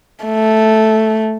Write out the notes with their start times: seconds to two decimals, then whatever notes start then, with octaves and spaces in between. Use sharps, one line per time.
0.25 A3